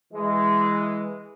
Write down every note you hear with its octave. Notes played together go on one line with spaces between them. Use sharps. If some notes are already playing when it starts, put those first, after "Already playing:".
E3 G#3